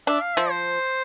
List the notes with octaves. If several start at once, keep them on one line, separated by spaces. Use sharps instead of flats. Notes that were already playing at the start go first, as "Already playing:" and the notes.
D4 E5
F5
F3 E5
C5